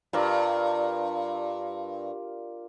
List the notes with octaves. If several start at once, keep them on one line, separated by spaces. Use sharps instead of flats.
G2 F4 A#4 D5